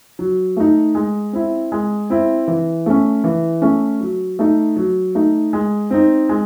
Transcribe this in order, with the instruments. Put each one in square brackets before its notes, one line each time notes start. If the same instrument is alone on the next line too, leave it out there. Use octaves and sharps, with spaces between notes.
[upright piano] F#3
A3 D#4
G#3
C4 E4
G#3
C4 E4
E3
A3 C#4
E3
A3 C#4
F#3
A3 D#4
F#3
A3 D#4
G#3
C4 D#4
G#3